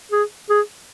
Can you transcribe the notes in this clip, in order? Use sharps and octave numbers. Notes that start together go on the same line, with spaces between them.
G#4
G#4